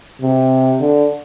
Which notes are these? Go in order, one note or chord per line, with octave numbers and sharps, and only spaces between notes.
C3
D3